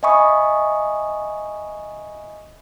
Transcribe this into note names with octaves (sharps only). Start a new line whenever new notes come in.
D#5 E5 G#5 B5 C#6 D#6